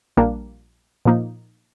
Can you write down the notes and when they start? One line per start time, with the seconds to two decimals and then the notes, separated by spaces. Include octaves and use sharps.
0.17 A#1 A#2 G3 A#3 D4
1.05 A#2 F3 A#3 D#4